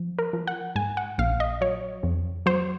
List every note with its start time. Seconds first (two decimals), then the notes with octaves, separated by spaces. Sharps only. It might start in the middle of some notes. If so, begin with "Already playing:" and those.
Already playing: F3
0.19 A#4
0.33 F3
0.48 F#5
0.76 G#2 G#5
0.97 F#5
1.18 A#1 F5
1.40 D#5
1.61 F#3 C#5
2.03 F2
2.46 F#3 C5